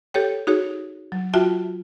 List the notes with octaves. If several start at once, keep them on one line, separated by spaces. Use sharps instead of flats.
G4 A4 C#5 G5
D#4 F#4 G#4 C#5
F#3
F4 F#4 E5 G5 A5